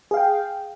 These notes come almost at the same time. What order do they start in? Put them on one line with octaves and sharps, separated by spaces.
G#4 F5 G5